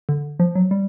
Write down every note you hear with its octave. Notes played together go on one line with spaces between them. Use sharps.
D3
F3
F#3
G3